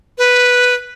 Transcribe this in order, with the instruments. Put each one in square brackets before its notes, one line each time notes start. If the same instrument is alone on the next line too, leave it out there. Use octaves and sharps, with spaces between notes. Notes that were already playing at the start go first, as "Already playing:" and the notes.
[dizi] B4